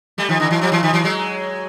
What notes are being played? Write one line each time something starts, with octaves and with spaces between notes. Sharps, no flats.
G3 A3
D#3 F3
D3 E3
E3 F#3
F3 G3
E3 F#3
D#3 F3
E3 F#3
F#3 G#3